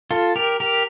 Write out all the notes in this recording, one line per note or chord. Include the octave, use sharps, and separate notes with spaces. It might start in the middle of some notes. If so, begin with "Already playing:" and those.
F4 A4
G4 A#4
G4 A#4